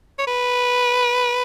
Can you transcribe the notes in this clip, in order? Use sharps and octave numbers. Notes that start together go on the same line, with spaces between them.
C#5
B4